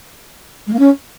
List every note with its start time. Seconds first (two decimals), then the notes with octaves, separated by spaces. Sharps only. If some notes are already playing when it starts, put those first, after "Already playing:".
0.67 G#3
0.73 A#3
0.79 C#4